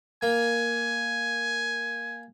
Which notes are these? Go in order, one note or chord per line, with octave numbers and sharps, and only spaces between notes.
A#3 G#5